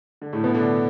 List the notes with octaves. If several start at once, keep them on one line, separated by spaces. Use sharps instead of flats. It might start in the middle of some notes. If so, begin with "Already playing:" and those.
D3
A2 A3
B2 B3
D3 D4